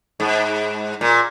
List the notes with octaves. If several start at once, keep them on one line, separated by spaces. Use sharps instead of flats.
G#2
A#2